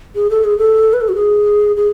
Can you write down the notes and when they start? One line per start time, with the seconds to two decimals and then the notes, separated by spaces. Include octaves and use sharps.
0.15 G#4
0.30 A4
0.44 G#4
0.58 A4
0.93 B4
1.01 A4
1.09 F#4
1.15 G#4
1.76 G#4